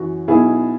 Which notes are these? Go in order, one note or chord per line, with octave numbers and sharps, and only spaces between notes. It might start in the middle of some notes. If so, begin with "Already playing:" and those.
Already playing: F#2 E3 F#4
B1 B2 B3 E4 G#4